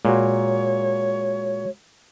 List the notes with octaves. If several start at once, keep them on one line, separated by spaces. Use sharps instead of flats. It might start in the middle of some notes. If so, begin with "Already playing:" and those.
A#2 G#3 F#4 C#5